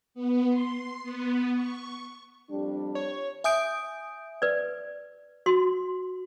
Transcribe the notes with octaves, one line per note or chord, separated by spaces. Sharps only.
B3
C6
B3
C#6
F2 G3 D4
C#5
E5 G#5 D#6 G6 D7
B4 D5
F#4 C6